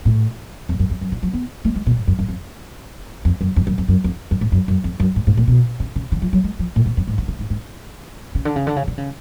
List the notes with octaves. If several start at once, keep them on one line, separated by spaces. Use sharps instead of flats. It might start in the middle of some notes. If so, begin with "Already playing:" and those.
A2
F2
F#2
F2
F#2
D3
F3
B3
A3
G#3
B2
G#2
F#2
F#2
F2
F2
F#2
F2
F#2
F2
F#2
F2
F#2
G#2
F#2
F#2
F2
F#2
G#2
G#2
A2
B2
C#3
C#3
D3
F3
F#3
G#3
F3
A2
G#2
F2
G#2
D3
C#3
G#2
G#2
C#3
D3
C#3
D3
C#3
D3
C#3